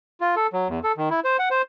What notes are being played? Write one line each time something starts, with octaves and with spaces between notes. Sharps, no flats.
F4
A4
F#3
E2
A4
D#3
E4
C5
F#5
C5